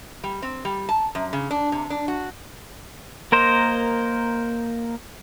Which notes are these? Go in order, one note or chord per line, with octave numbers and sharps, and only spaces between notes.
G3
C4
G3
A5
F#2
C#3
D4
C3
D4
F#4
A#3 A#4 C5 D#5